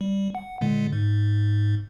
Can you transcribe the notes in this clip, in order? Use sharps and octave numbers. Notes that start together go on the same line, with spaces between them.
G3
F#5
A#2 D3 G#3
G#2